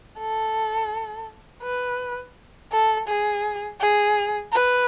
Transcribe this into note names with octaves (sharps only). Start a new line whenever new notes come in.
A4
B4
A4
G#4
G#4
B4